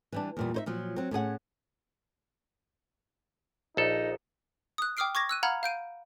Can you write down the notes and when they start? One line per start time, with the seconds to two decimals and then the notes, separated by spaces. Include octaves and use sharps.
0.12 E3 G3 D4
0.37 E2 A#2 G3
0.54 D#4 C5 E5
0.66 A#2 F3 F#3
0.96 F#3 C4
1.11 A2 C#4 G#4 F#5
3.77 A#1 D#4 A4
4.78 D#6 F#6
4.97 G5 D6 D#6 F6 C7 D7
5.15 C#6 D6 G#6 A#6
5.29 E6 F#6 D#7
5.43 F5 F#5 A#5 B5 F6 G#6
5.63 F5 G6 D7 D#7